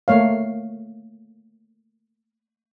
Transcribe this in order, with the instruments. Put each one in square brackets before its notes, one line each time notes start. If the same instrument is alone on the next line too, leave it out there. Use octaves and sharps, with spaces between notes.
[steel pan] A3 A#3 C#5 F5